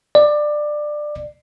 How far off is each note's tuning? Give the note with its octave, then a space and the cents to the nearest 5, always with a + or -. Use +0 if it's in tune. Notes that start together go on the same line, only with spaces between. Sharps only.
D5 +20